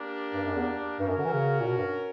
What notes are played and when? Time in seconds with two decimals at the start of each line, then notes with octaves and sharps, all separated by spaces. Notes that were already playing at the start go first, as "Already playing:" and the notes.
Already playing: A#3 D4 G4 A#4
0.34 G2
0.45 F#2
0.55 E2
1.00 G2 C#4 F#4 A#4
1.08 F#2
1.17 D3
1.25 E3
1.33 C#3
1.60 A#2
1.67 B2
1.77 G2